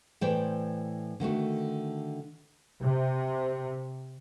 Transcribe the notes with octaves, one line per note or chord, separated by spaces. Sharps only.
A2 E3 C5 D5 G5
D3 D#3 A3 F#4
C3